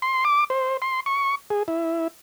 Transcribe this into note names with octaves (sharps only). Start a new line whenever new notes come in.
C6
D6
C5
C6
C#6
G#4
E4